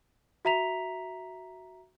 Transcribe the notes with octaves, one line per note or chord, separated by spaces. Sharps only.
F#4 E5 A#5 B6 F7